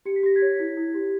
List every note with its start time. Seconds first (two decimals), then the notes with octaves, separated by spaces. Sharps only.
0.06 G4 C#7
0.16 B6
0.23 G4 A#6
0.36 G#6 B6
0.42 C#5
0.60 E4
0.77 E4
0.94 G4